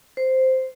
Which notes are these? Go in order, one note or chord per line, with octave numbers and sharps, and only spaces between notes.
C5